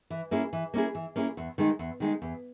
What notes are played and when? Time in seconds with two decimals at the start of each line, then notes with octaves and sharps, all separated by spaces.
0.10 E3
0.31 A#3 C#4 E4 G#4
0.53 E3
0.74 A#3 C#4 E4 G#4
0.95 E3
1.16 A#3 C#4 E4 G#4
1.37 E2
1.58 D#3 G#3 D#4
1.79 E2
2.00 D#3 G#3 D#4
2.22 E2